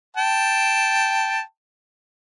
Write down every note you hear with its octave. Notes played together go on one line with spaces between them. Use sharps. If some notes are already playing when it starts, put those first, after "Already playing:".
G5 A5